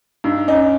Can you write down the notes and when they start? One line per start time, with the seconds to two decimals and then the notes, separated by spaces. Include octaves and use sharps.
0.24 G2 D#4
0.48 C#4 D#4